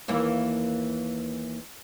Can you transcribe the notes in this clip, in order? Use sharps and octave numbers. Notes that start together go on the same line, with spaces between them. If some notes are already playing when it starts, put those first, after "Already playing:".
D#2 E3 A#3